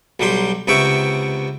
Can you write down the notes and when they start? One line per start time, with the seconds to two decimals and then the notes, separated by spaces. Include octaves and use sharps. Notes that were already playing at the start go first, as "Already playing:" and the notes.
0.20 B1 F#3 G3 G4 C6
0.67 C#2 C3 B3 E5 G5 C#6